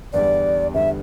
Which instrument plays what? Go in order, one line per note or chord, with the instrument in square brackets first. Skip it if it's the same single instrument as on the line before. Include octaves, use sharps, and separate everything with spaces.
[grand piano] E2 D3 G3 [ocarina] D5
[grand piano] E2 D3 G3 [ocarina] E5